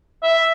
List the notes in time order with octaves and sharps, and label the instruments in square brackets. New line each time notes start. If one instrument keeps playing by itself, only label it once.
[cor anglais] E5